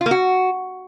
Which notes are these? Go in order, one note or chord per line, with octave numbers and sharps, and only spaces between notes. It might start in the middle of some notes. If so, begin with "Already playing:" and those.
F4
A#3
F#4